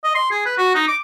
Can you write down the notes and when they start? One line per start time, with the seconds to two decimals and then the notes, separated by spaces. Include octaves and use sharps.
0.04 D#5
0.15 C6
0.31 G#4
0.46 B4
0.58 F#4
0.75 D#4
0.87 D6